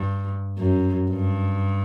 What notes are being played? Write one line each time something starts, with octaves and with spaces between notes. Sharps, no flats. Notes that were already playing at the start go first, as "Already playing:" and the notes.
Already playing: G2
F#2
G2